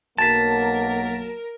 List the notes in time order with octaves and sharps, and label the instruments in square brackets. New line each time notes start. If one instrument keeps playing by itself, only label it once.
[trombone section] B1 F#3 A#3 [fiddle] A#4 [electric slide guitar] A5 [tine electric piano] A6 B6